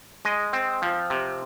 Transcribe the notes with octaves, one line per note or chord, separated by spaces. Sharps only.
G#3 D#5
C4
F3
C3